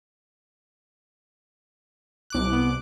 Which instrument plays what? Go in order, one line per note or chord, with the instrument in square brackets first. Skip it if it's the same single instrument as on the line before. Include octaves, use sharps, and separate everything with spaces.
[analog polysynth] C2 D6 F#6
[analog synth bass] B3